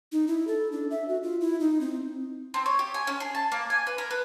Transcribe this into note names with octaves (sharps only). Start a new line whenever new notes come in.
D#4
E4
A4
D4
E5
F#4
F4
E4
D#4
C4
C4
C#5
G4
G#5
C#4
G#4
A5
A#3
G#5
B4
A#4
B4